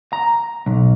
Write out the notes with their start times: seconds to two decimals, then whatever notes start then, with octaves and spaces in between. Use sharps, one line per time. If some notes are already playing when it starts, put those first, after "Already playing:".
0.13 A#5
0.66 B1